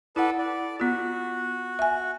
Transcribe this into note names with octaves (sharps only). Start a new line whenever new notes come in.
E4 A4 B4 D5 F#5
D5
B3 F4 F#4
E5 G#5